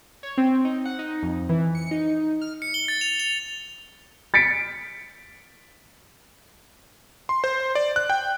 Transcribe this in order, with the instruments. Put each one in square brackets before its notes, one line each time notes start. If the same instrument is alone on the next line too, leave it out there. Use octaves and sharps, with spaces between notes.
[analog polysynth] C#5
C4
D#4
F#5
D#4
F2
E3
C#7
D#4
F6
[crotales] C#7
G7
A6
F7
F7
[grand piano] A6 B6 C#7 D7
[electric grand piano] C6
C5
D5
F#6
G5